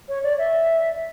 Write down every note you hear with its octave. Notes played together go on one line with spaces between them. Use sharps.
C#5
D5
E5